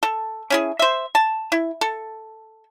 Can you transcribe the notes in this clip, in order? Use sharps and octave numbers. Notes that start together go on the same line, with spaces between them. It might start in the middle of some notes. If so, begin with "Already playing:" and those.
A4
C#4 E4 G#4
C5 E5
A5
E4
A4